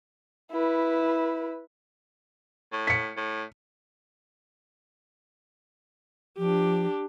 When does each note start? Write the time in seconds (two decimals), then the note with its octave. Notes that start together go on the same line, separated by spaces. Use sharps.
0.52 E4 B4
2.72 A2
2.87 B6 C#7
3.17 A2
6.38 F3 D4 G4